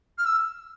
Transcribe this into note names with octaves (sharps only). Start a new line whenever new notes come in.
F6
E6